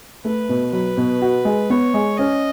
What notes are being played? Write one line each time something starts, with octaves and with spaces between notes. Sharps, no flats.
A3 B4
B2
F#3 B4
B2
F#4
G#3
B3 C#5
G#3
C#4 D#5